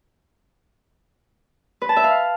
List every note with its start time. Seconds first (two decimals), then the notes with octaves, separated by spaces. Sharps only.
1.82 B4
1.89 A5
1.97 E5
2.04 F5